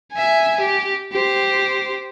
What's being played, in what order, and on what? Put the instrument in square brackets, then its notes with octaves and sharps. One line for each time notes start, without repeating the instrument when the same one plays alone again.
[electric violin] E5 G#5
G4
G4 C5